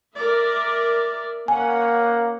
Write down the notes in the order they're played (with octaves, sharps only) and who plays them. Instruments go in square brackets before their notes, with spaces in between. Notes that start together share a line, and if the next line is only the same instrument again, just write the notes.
[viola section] A#4 D5 E5
[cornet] A#3 [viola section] C#4 F#5 [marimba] G#5